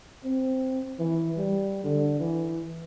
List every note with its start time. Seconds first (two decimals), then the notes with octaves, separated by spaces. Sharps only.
0.24 C4
0.99 E3
1.38 G3
1.84 D3
2.20 E3